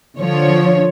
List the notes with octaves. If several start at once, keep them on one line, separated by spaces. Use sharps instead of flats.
D3 F3 C#5